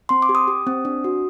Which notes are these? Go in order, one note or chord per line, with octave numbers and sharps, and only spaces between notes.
C4 C6
D6
G4
D#6
G4
C4
D4
F#4